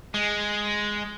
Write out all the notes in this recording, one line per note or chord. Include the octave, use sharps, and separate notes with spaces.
G#3